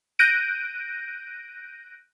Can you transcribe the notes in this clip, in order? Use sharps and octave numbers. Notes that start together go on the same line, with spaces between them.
F#6 G6 A#6 D7 D#7